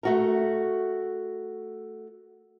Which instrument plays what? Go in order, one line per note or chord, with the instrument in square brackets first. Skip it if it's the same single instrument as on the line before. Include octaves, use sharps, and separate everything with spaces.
[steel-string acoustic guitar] A3 F#4 A#4